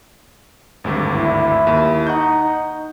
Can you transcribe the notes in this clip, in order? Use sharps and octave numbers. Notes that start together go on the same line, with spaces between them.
G#1 D2 G2
E4
D#2
D#4 F#5 C#6 G6